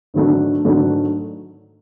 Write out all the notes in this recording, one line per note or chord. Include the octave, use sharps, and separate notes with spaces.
G#2 D#3 F#3 A3 D4
G#2 D#3 F#3 A3 D4